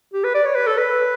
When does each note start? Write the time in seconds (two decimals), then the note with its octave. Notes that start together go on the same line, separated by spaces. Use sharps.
0.13 G4
0.24 B4
0.34 D5
0.45 C#5
0.55 B4
0.67 A4
0.78 B4